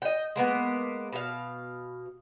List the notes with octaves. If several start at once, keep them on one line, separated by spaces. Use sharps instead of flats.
D#5 G5
G#3 A#3 B3
B2 F5